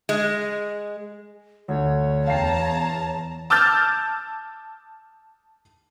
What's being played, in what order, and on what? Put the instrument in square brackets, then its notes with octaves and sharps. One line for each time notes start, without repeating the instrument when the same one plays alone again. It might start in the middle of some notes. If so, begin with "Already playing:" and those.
[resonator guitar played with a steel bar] G#3
[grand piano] D2 [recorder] C#5
[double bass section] E2 [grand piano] F5 G5 C7 [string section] A5 A#5
[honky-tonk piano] A5 D6 E6 F6 G6 A6